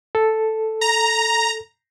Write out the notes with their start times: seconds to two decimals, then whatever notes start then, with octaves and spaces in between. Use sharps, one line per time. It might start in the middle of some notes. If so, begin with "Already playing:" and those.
0.15 A4
0.81 A#5